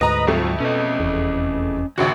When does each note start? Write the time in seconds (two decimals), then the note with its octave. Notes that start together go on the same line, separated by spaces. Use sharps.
0.01 D2 G#2 B4 D#5 A#5
0.27 F2 F#3 A3 F4
0.60 B2 C#4 D#5
1.00 F1 E2
1.98 A#1 D#2 C#3 F#4